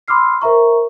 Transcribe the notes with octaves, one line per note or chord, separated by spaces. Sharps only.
B5 C6 D6 E6 F6 C7
A#4 C5 E5 A#5 C#6